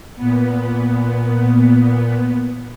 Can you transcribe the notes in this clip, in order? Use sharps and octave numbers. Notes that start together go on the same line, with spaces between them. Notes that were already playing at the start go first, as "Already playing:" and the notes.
A#2 B3